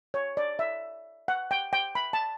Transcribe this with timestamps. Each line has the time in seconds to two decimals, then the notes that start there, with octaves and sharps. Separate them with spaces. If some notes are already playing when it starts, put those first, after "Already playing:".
0.14 C#5
0.37 D5
0.59 E5
1.28 F#5
1.51 G5
1.73 G5
1.95 B5
2.13 A5